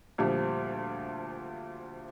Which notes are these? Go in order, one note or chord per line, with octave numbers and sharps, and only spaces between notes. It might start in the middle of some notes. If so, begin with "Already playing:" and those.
D2 A#2 F3 G3